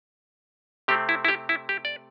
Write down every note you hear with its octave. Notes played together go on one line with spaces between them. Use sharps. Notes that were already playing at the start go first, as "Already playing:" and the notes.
C3 A3 C4 G4
E4
E4
G4
E4
G4
D5